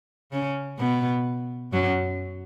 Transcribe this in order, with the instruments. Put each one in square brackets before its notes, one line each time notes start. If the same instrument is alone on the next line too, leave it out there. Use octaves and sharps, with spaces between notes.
[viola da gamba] C#3 C#4
B2 B3
F#2 F#3